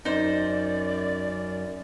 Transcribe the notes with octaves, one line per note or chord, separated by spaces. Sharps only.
F#2 D#4 C5 D5